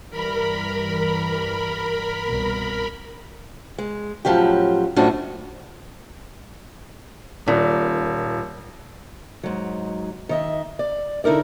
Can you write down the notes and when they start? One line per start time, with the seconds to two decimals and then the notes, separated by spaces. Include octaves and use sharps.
0.11 G2 E3 G3 A#4 B5
2.26 C2 B2
3.78 G#3
4.25 A2 F3 F#3 C#4 G4
4.96 F#2 A2 F3 C#4 D4 F#4
7.48 D#1 A#2
9.43 G#2 F#3
10.29 D#3 D#5 E5
10.79 D5
11.24 D3 D#4 E4 A#4 D5